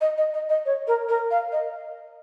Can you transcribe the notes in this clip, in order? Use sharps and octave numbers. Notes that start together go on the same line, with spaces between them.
D#5
D#5
D#5
D#5
C#5
A#4
A#4
F5
D#5